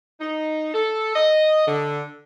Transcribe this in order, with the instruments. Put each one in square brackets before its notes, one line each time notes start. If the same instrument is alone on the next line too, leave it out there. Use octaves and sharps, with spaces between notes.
[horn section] D#4
A4
D#5
D3